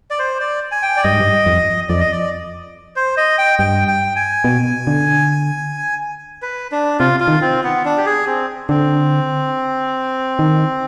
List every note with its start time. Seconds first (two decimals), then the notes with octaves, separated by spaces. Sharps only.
0.10 D5
0.19 C5
0.40 D5
0.72 G#5
0.82 G5
0.97 D5
1.04 G2 D#5
1.12 G#2
1.20 G2
1.46 F2
1.89 F2 D5
2.00 D#5
2.12 D5
2.96 C5
3.17 D#5
3.38 G5
3.59 G2 G5
3.88 G5
4.16 G#5
4.44 B2
4.87 D3
6.42 B4
6.72 D4
6.99 C3 F4
7.20 F4
7.28 D#3
7.41 C4
7.64 B3
7.85 D4
7.98 G4
8.06 G#4
8.27 C4
8.69 D3 C4
10.39 D#3